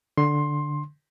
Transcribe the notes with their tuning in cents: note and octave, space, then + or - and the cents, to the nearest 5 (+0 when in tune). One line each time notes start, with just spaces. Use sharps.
D3 +0 C6 +15